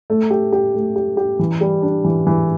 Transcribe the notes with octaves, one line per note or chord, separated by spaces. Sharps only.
A3
G4
G4
A3
G4
G4
E3
G3
D4
E3
E3